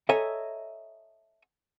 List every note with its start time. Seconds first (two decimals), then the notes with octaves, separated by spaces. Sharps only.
0.09 A4 C#5 D#5 E5 G#5 A#5